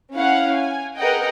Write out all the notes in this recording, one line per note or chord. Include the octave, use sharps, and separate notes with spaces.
C#4 E4 F5 F#5
G#5
G#4 A#4 B4 D#5 F#5 G5